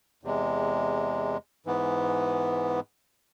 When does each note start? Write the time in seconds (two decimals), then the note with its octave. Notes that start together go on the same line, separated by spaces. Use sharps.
0.23 E2 C3 G#3
1.66 G#2 E3 B3